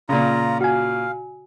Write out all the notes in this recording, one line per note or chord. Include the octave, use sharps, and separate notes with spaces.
A#2 C#3 F4 A#5
F#4 F5 G#5